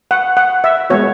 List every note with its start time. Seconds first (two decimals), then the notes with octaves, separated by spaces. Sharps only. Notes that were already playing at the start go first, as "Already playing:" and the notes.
0.11 F#5
0.37 F#5
0.64 E5
0.90 G#3 B3 F#4 C#5